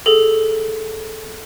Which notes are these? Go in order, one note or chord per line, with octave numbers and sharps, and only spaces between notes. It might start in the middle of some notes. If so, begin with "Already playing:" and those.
G#4 A4